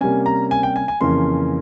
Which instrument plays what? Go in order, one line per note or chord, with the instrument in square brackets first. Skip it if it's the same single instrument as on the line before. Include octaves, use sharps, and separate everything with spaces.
[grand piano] C3 G3 A#3 C#4 G#5
A#5
G#5
G5
G#5
G#5
F2 C#3 E3 A#3 C#4 C6